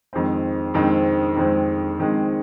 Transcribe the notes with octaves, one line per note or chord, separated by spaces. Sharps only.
F2 D#3 G#3 C4
F2 D#3 G#3 C4
F2 D#3 G#3 C4
F2 D#3 G#3 C4